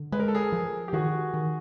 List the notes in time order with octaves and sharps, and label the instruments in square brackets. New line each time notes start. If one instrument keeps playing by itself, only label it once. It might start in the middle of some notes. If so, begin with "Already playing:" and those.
Already playing: [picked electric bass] D3
[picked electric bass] G#3 [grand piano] B4
[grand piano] A#4
A4
G#4 A#4
[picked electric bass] F3
[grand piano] G4
[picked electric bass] D#3 [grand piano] F#4 G#4
[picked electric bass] D#3